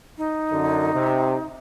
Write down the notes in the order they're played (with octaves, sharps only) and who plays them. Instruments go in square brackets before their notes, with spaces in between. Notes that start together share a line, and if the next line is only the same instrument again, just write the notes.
[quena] D#4
[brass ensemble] F#2 D3
C3